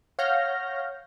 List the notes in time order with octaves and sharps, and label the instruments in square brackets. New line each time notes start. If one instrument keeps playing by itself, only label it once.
[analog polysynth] C#5 F5 F#5 F6 G6 A#6